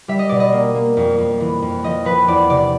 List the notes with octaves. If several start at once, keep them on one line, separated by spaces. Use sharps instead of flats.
G3 E5
D#5
B2 D5
D#5
A#3
A#3
F2
F2
E3
F2
F3 D#5
F3 B4
E2 D5
C3 D5